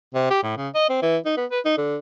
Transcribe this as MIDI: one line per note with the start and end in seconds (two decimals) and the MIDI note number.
0.14 0.28 48
0.30 0.39 67
0.43 0.57 45
0.57 0.69 49
0.75 0.89 75
0.89 0.99 60
1.02 1.17 52
1.25 1.37 63
1.37 1.45 59
1.51 1.60 71
1.65 1.77 63
1.78 1.97 50